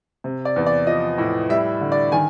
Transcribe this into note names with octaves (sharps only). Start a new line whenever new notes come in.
C3
D5
E2
D5
F3 D#5
A2
G3 E5
D3
D5
D#3 G#5